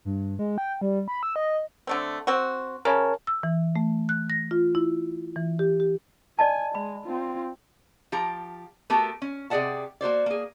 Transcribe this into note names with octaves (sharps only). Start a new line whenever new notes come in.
G2
G#3
G5
G3
B5
E6
D#5
D3 A3 C4
C4 F#4
C#3 A#4 C#5 A5
E6
E3
A3
F#6
A#6
F4
E4
E3
G4
G4
D5 D#5 G#5 A5
G#3 B5
C4 F4
F3 G4 A#5
A3 B3 F#4 G4 A4 A#4
C#4
C3 G4 G#4 D5 F#5 A5
A#3 F#4 C5 D5
A#3 G#4